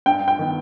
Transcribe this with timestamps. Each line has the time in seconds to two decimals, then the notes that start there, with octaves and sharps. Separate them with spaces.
0.06 G2 G5
0.28 G5
0.39 D#3 B3